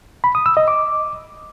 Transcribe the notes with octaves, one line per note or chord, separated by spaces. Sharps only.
B5
D#6
E6
D#5
D6